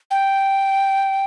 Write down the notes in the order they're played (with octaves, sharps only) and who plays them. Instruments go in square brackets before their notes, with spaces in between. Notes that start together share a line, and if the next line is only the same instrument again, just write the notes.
[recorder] G5